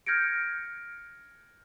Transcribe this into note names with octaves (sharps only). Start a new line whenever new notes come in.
F6 G6 G#6 A#6 C#7 D7